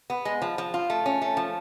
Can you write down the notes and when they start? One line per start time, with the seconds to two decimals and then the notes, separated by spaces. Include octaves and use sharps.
0.10 B3
0.25 G#3
0.42 F3
0.58 F3
0.74 F4
0.90 A3
1.06 C#4
1.22 A3
1.37 F3